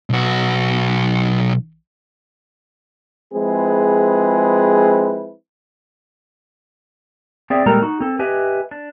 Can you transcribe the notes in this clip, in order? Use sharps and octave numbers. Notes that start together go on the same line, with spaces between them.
B1 F#4
F3 G#3 C4 E4 G#4 B4
C4 G#4 D5 E5
A#2 G3 G#3 A4 A#4 A#5
D#4 F#4
C4 A4
G4 B4 D#5 E5 G#5
D4